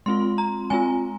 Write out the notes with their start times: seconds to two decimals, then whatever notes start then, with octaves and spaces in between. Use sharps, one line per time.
0.06 G#3 C4 F4 C6
0.38 A#5
0.70 G#3 C4 F4 G#5